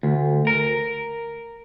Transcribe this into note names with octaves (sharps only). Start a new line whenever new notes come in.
D2
A#4